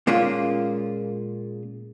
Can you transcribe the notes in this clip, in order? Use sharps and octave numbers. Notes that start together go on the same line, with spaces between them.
A#2 G#3 A#3 C#4 F4